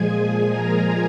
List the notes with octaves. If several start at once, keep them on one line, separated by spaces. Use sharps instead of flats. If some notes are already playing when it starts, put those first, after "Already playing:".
Already playing: A#2 F3 G#3 G#4 G#5
A#4 A#5